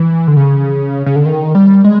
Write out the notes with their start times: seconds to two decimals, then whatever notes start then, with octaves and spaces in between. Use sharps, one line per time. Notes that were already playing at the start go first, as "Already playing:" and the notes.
Already playing: E3
0.28 D3
0.37 C#3
1.06 C#3
1.16 D3
1.26 D#3
1.55 G3
1.84 G#3